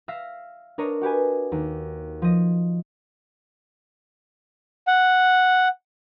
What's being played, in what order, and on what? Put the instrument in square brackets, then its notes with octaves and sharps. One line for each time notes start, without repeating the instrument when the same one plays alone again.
[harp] E5 F5 F6 A#6 C7
D4 A#4 C#5 D#5
F#4 G4 B4 G#5
D#2
F3 D#5
[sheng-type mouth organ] F#5